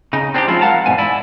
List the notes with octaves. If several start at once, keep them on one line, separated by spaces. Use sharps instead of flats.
C#3 D#4
C4 D4 D#4 F4 G4
F3 F#3 G#3 C#4 E4 F4
A#4 F5 F#5 A5 A#5
E2 G#2 B2 G#5
E4 D5